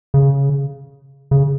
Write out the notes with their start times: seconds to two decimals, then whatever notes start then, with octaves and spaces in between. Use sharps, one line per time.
0.14 C#3
1.31 C#3